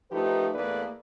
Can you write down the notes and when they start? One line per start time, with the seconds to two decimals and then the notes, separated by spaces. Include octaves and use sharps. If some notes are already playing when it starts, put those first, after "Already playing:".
0.11 F3 A3 D#4 G4 A#4 B4
0.54 E2 A3 A#3 A4 B4 D5